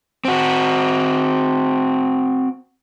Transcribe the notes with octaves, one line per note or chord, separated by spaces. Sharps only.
C4 F#4